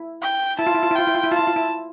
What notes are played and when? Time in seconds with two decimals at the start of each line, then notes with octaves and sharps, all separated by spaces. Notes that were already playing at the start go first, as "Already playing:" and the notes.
Already playing: E4
0.22 G5
0.59 E4 A5
0.66 F4
0.74 E4
0.83 F4
0.91 E4
0.95 F4 G5
1.07 E4
1.15 F4
1.24 E4
1.32 F4 A5
1.39 E4
1.47 F4
1.56 E4